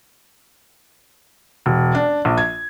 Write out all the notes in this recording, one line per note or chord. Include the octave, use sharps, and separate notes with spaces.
E1
D4
A#1
G#6